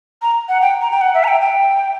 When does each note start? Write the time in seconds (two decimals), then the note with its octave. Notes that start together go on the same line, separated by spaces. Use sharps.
0.22 A#5
0.49 F#5
0.61 G5
0.81 A#5
0.91 G5
1.01 F#5
1.14 E5
1.24 A#5
1.28 G5
1.41 G5